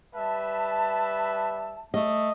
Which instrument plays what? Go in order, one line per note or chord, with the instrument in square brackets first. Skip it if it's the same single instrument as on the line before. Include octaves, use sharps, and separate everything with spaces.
[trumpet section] G3 B4 E5 [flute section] A5
[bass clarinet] A3 [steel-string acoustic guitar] D#5